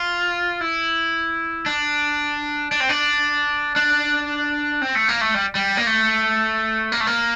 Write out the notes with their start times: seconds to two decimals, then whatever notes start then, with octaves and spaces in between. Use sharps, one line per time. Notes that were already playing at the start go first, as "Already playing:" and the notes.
Already playing: F4
0.61 E4
1.66 D4
2.72 D4
2.80 C4
2.89 D4
3.76 D4
4.82 C4
4.95 A3
5.09 A#3
5.21 A3
5.34 G3
5.55 G3
5.77 A#3
5.87 A3
6.92 A#3
7.00 A3
7.07 A#3